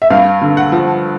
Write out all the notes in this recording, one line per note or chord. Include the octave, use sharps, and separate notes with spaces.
E5
G2 F5
D3
F#5
F3